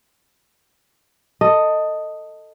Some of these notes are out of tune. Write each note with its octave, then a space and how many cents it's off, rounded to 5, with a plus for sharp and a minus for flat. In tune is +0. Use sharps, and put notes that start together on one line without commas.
A4 +20 D#5 +0